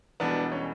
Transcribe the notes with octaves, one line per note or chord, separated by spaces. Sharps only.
E1 E2 B2 G3 B3 D4
C#4